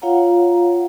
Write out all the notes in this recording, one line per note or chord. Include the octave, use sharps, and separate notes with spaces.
F4 C#5 F5 F#5 A#5